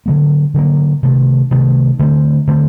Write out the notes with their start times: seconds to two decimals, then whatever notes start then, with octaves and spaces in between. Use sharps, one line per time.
0.06 D3 F#3 A#3
0.54 D3 F#3 A#3
1.03 C3 D#3 A3
1.51 C3 D#3 A3
1.99 D3 A3 C4
2.47 D3 A3 C4